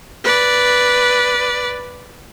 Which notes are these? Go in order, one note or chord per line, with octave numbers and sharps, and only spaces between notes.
B4 D5